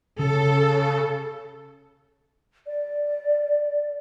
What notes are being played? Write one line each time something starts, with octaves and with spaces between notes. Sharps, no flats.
C#3 A4
D5